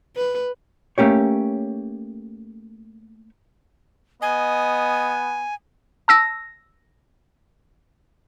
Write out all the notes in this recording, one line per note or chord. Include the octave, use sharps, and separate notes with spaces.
B4
A3 A#3 C#4 G4 C#5
B3 D#5 G#5
A5 E6 A#6